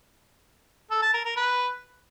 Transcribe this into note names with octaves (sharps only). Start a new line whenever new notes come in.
A4
A5
A#4
A#4
B4